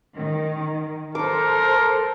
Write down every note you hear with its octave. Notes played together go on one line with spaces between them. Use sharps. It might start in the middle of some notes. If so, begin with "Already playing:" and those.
D#3
A4 A#4 C5 A5 D6